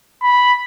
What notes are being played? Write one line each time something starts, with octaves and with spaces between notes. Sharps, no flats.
B5